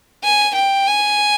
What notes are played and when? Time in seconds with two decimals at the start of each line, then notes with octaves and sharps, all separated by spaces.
0.24 G#5
0.56 G5
0.87 G#5